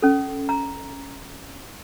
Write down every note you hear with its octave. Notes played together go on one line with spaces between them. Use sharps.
C#4 A4
A#5